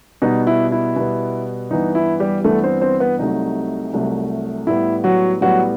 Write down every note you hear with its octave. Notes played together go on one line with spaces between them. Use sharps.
B2 G3 B3 D#4
E4
E4
B2 G3 B3
G2 E3 B3 D#4
E4
G3 G4
G2 E3 A3 B3 A4
C4 C5
C4 C5
B3 B4
C2 C3 F#3 A3 D#4
C2 C3 F#3 A3
A2 G3 B3 E4
F#3 F#4
A2 F#3 G3 B3 F#4